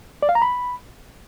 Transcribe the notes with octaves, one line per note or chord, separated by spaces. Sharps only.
D5
F5
A#5
B5